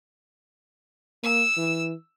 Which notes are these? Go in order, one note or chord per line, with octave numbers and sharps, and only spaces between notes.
A#3 E6
E3